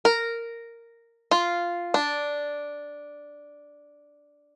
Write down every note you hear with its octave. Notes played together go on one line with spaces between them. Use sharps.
A#4
F4
D4